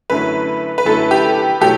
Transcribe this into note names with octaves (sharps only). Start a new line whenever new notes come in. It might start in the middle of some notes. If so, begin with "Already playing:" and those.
F#2 D3 F#3 A3 E4 B4
B4
F#2 D3 F#3 A3 E4 A4
G4
B2 F#3 A3 E4 G4 A4